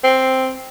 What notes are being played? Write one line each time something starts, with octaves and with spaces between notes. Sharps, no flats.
C4